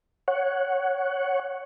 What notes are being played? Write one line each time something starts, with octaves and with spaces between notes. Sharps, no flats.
C#5 F#5